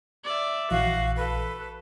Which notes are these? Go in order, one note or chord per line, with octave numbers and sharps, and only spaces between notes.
D5 E5
A#1 E3 F#4 F5
A4 B4